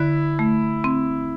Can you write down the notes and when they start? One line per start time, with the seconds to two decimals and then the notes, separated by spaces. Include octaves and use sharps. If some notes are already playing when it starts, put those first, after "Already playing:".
Already playing: D3 E4
0.39 A3
0.84 C4